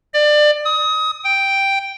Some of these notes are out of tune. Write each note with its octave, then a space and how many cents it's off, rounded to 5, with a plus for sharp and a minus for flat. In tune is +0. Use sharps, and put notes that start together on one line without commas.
D5 +25
D#6 +25
G5 +0